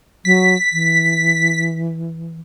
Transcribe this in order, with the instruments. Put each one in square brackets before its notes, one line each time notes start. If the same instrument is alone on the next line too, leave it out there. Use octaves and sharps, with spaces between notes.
[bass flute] F#3 [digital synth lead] B6
[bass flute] E3